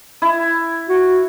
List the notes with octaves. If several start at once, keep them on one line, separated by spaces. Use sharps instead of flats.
E4
F#4